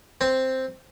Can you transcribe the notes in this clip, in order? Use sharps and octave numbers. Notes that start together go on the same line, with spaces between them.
C4